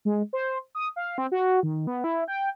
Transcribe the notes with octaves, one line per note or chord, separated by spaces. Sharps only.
G#3
C5
D#6
F5
C4
F#4
D#3
B3
E4
G5